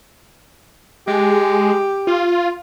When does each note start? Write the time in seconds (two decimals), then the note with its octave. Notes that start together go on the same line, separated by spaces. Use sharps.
1.07 G#3 G4
2.07 F4